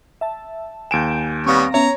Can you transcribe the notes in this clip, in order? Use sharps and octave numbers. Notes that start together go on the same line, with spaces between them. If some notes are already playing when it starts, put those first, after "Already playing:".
E5 A5
D#2 G#5 G6 D7 E7
G3 B3 C4 C#5 F5 A#6
B3 C#4 C#5 E5 A#5